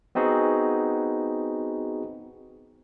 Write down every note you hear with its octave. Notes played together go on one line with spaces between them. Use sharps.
B3 C4 D#4 F#4 G#4